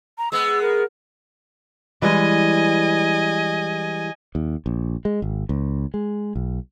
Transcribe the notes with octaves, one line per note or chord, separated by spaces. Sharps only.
A#5
G#3 B3 E6
A#4
E3 G3 G#3 D#5 G#5
D#2
A#1
G#3
G#1
C#2
G#3
B1